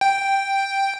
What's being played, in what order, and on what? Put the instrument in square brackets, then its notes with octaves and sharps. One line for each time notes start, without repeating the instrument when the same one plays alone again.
[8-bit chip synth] G5